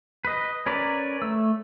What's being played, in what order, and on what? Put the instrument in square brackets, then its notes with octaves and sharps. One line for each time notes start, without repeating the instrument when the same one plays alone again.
[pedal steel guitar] B4 D#5
C#4 A#4 B4 C#5 D5
A3 E6